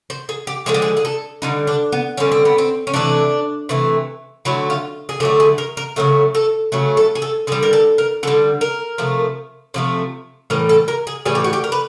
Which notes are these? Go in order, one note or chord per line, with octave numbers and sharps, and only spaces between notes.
C5
G#4
G4
D3 F3 G#3 G#4
G4
G#4
G#4
A4
D3 G3 D#4
D4
B3
D3 G3 C#4
C4
B3
C4
C#4
C3 E3 A3 D4
C3 E3 A3
D3 F#3 A3 E4
F4
G#4
D3 F#3 A3 G4
G#4
A#4
A#4
C#3 F#3 A3 A#4
A4
C#3 F#3 A3
A4
G#4
A4
D3 G3 G#4
A#4
A4
A#4
D3 G3 A4
A#4
C3 F3 A3
C3 F3 A3
A2 E3 G3 A#4
A4
A#4
G#4
A2 E3 G3 G#4
G4
F#4
G4
A#4
B4